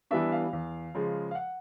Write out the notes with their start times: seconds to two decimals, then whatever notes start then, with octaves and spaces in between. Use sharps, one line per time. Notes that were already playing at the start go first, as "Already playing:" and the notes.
0.11 E3 G3 B3 D4 E5
0.32 F5
0.53 E2
0.95 C#3 F3 G#3
1.31 F5
1.35 F#5